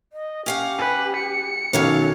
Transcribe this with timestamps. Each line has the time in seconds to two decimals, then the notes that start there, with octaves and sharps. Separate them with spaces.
0.13 D#5
0.46 C#4 G4 F5 F#5
0.78 B4 G#5
1.16 C#7
1.73 B1 F#2 D#3 C#4 A4 C#5 F5